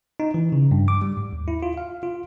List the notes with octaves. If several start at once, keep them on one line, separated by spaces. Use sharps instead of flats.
D#4
E3
C#3
G2
D6
G3
G#2
D#2
E4
F4
F5
F4